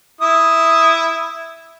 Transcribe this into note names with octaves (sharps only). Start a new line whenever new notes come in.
E4 D#6